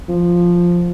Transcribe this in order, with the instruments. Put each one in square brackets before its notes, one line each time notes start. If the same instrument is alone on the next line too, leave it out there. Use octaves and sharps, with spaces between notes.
[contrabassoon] F3